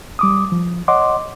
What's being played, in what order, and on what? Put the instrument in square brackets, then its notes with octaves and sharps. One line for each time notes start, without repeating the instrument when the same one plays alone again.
[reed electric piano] G3 D6 D#6
F3
C#5 D#5 F#5 C6 D6